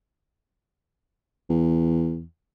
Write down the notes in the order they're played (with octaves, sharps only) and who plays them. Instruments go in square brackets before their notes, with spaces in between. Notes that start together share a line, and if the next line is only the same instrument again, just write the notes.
[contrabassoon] E2